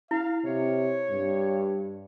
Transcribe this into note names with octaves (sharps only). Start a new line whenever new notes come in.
E4 F5
C3 C#5
G2